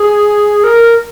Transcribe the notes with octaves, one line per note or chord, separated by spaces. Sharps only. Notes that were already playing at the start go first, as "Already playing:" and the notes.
Already playing: G#4
A#4